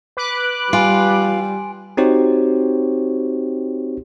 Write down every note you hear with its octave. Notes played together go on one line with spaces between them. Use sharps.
B4 D6 F#6
G3 F4 G#5 C6 D7
C4 D#4 F#4 G4 C5 C#5